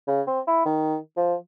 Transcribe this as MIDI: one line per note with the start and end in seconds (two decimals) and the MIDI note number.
0.07 0.21 49
0.27 0.40 60
0.47 0.63 64
0.66 0.97 51
1.17 1.35 53